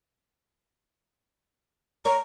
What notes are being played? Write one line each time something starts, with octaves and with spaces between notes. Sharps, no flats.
A#4 C#5 A#5